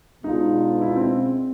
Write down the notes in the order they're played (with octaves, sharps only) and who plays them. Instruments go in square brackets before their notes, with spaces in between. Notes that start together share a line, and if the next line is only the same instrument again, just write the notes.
[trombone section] B2 G#3 B3 D4 F4 [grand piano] D#4
[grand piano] E4
C4